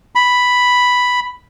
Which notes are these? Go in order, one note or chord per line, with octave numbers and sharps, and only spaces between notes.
B5